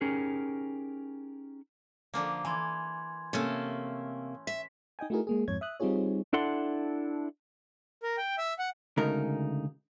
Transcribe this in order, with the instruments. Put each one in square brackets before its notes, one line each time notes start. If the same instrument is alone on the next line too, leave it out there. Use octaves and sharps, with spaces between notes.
[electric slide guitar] C#4 D#4 G4 G#4 A#4
[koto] D3 F3 A#3
[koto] E3 [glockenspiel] G#5 C6 G#6
[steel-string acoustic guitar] C3 A#3 [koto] A3 C#4 A4
[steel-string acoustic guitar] E5 [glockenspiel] B6
[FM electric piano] D#4 D#5 G5 G#5
A3 D#4 E4 F#4 G#4 A#4
G#3 A#3 G#4
F2 G#2 C#5 G#6
E5 D#6 F#6
G3 C4 D#4 F4 G#4 C#5
[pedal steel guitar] D4 E4 A4 F#5 C6
[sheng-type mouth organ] A#4
G5
E5
F#5
[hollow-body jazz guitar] D2 C#3 G#3 A3 D#4 A#4